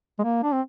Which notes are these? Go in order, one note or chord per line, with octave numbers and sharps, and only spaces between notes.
G#3
A#3
D4
C4